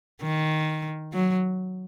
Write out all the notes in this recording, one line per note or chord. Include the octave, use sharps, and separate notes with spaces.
D#3
F#3